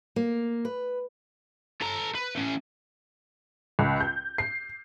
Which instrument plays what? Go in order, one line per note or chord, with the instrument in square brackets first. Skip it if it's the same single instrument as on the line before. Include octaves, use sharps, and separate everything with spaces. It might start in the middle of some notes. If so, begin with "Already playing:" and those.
[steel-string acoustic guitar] A#3
B4
[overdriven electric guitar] A4 A#5
B4
A3 C#4
[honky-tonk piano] C#2
G6
C7